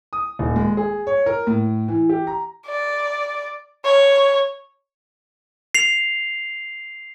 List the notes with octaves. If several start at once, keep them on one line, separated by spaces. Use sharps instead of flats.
D#6
D#1
G#3
G#4
C#5
A#4
A2
E3
G4
A#5
D5
C#5
C7 F7